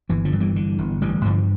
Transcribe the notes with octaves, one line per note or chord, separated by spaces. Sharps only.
G1 E3
D3 F3
G2
E3 G3
D3
G1
A1 E3 G3
G2 D3 F3